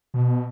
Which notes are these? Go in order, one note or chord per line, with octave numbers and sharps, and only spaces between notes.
B2